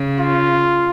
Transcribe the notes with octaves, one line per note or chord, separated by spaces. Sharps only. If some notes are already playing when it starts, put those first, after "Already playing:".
Already playing: C#3
F4